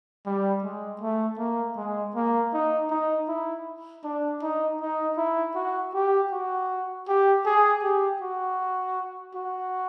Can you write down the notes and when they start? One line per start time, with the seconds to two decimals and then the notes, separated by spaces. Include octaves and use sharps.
0.26 G3
0.63 G#3
1.01 A3
1.38 A#3
1.76 G#3
2.15 A#3
2.53 D#4
2.90 D#4
3.28 E4
4.04 D4
4.43 D#4
4.81 D#4
5.17 E4
5.55 F#4
5.94 G4
6.31 F#4
7.08 G4
7.46 G#4
7.83 G4
8.21 F#4
9.35 F#4